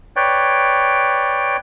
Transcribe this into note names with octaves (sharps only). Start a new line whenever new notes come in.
B4 C#5 D5 G5